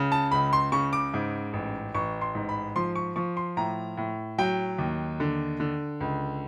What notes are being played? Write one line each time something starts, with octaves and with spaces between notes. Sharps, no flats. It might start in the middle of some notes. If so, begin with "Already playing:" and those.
Already playing: C#2 C#3
A5
C#2 B5
C6
C#3 C#6
D6
G#2
A1
A1 C#6
C6
G#2
B5
F3 C6
C#6
F3 C#6
C6
A2 A#5
A2
F#3 G5
D#2
D3
D3
C#2